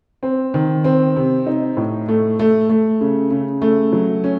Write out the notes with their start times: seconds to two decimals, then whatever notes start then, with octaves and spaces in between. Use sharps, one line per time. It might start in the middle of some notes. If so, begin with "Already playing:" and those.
0.23 C4
0.54 D#3
0.84 C4
1.16 C3
1.47 D#4
1.77 A2
2.08 A3
2.39 A3
2.69 A3
3.01 C#3
3.31 C#3
3.62 A3
3.92 F#3
4.24 C#4